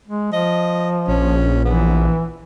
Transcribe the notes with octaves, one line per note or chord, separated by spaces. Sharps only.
G#3
F3 D#5
A#1 C#4
E3 B3